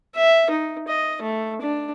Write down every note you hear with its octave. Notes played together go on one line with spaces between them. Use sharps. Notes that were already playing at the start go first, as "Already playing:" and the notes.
E5
D#4
D#5
A3
D4